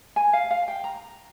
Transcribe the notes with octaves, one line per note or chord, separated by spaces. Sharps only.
G#5
F5
F5
G5
A#5